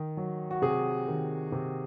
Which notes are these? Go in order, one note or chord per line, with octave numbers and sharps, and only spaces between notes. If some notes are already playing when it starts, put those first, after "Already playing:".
Already playing: D#3
F#3
F#4
C3 G#4
D#3
C3